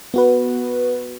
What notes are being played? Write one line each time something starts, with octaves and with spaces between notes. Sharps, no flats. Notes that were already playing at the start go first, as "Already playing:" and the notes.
B3 F#4 B4